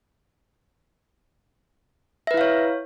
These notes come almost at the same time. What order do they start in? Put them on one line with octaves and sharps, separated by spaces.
E5 B4 E4 F5 C#5